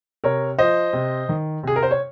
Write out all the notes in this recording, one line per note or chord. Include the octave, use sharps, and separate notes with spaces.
C3 A#4 C#5
F3 C5 D#5
C3
D#3
C3 G#4
A#4
C5
C#5